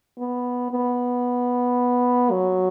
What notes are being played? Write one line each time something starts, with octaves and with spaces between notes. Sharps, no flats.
B3
B3
F#3